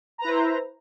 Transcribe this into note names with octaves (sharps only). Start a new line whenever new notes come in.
E4 B4 C5 A#5